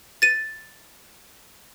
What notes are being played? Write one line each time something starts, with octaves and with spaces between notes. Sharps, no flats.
A6 D#7